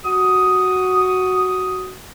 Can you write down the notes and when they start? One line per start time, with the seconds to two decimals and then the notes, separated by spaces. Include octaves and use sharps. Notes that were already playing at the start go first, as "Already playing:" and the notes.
0.05 F#4 D#6